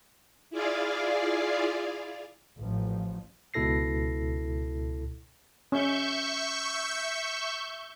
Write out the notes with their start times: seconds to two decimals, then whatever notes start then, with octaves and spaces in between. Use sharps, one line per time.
0.50 E4 F4 G#4 D5 F5
2.58 A1 F3
3.54 C#2 B2 E4 A4 A#6 C7
5.72 C#4 E5 C#6 G6